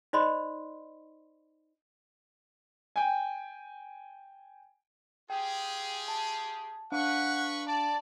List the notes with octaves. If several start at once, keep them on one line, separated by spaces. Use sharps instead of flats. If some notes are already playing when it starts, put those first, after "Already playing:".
D#4 C5 D5 D#5 B5 C6
G5 G#5
F4 G4 G#4 G5
A5
D4 B4 F5 F#5 C#6
D5 A5